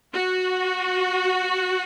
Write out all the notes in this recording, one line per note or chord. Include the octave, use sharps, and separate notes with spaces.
F#4